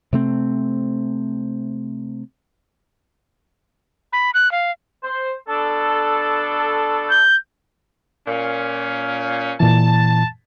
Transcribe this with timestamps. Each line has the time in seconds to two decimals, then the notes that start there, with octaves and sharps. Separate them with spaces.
0.13 C3 A3 C4
4.13 B5
4.34 F#6
4.52 F5
5.04 C5
5.48 B2 D4 A4
7.10 G6
8.27 A#2 C#4
9.60 A#2 E3 A5